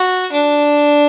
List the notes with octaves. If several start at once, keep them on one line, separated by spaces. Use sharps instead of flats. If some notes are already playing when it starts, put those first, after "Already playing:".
Already playing: F#4
D4